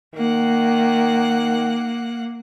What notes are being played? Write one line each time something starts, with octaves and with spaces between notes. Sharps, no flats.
D#3 A#3 F#5